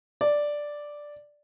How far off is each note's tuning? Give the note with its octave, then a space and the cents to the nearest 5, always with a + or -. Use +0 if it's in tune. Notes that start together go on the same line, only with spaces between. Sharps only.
D5 +0